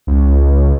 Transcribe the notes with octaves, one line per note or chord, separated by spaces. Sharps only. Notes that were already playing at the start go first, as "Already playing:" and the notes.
C#2